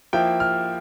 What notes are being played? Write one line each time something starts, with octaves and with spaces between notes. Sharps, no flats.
F3 A#3 E4 G5
F6